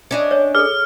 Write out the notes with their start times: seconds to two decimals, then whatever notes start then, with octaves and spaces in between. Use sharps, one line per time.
0.11 C#4 D4 D#5
0.31 C#5
0.55 G#4 A4 F6